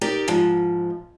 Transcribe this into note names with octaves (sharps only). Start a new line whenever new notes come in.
D#4 G4 A#4 D5
G#2 F3